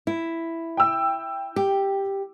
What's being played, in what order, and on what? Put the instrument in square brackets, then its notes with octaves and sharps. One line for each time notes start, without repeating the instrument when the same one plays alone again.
[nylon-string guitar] E4
[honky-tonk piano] G5 E6
[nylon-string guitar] G4